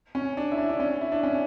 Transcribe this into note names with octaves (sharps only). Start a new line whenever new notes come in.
C#4
D4
E4
D4
D4
C#4
E4
D4
C#4